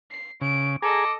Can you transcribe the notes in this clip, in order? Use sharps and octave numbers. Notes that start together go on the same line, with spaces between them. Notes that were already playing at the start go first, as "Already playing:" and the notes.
C7
C#3 D7
G#4 A4 D#5 A#5 D6